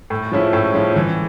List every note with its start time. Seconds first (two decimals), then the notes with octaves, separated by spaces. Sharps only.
0.10 A2
0.32 F3 G#3 C#4 E4
0.53 A2
0.74 F3 G#3 C#4 E4
0.96 E3